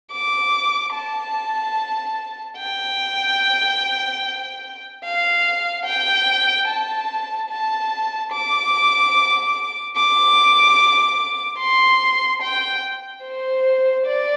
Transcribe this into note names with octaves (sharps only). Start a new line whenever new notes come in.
D6
A5
G5
F5
G5
A5
A5
D6
D6
C6
G5
C5
D5